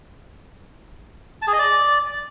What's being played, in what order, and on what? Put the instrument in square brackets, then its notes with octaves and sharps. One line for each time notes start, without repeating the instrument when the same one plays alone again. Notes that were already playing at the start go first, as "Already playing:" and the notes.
[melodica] A5
G#4
D#5
D5